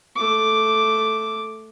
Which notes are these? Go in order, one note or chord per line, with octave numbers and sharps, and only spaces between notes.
A3 D6